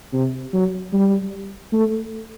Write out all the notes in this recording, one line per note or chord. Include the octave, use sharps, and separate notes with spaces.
C3
F#3
G3
A3